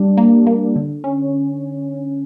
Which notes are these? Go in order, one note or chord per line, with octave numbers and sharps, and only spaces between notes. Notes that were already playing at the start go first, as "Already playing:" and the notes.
Already playing: G3 D4
A#3
A#3
D3
C#4